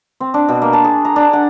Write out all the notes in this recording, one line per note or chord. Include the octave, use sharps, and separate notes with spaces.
C4
D4
B2
A#3
A5
G#4
A#5
D4
F#5